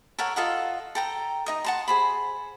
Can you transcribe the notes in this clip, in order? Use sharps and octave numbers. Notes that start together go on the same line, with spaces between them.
A4 A#4 C#5 F#5
F4 A4 D#5 F#5
A4 G5 A#5
D#4 D#5 D#6
F#5 A5 C6
G#4 C5 B5